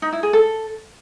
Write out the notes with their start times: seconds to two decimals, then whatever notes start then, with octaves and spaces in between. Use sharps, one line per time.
0.02 D#4
0.13 E4
0.23 G#4
0.33 A4